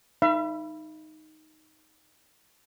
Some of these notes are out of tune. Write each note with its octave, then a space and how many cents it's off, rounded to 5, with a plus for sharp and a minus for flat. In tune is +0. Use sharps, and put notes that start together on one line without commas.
D#4 +0 E5 +45 B5 -10